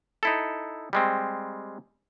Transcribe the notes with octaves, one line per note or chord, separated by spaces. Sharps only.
D#4 E4 A4
G3 G#3 C4